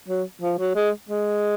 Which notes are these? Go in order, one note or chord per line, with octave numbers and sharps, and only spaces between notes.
F#3
F3
F#3
G#3
G#3